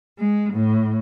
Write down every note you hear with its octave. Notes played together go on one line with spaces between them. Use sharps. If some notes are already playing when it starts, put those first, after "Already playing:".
G#3
A2